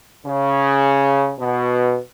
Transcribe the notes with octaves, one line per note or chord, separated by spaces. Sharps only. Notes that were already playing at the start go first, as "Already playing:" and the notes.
C#3
B2